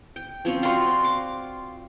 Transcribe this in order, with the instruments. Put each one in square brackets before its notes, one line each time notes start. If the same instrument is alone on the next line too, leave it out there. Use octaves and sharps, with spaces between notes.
[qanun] G5
F3 C4 C#4
[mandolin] F4 C6 [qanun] F#4 D5
[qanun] D6